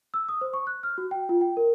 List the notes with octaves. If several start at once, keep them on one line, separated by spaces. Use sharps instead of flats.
E6
D#6
C5
C#6
F#6
F6
F#4
G5
F4
G5
A#4